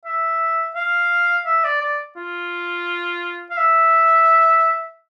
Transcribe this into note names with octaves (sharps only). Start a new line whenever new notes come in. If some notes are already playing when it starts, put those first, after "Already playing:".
E5
F5
E5
D5
D5
F4
F5
E5